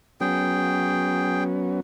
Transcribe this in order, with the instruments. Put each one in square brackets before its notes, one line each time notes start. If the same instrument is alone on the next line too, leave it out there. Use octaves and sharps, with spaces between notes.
[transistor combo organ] F#3 B3 C#4 [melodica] G#4 G5